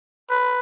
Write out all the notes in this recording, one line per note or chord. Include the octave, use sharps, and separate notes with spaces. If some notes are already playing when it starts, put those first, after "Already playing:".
B4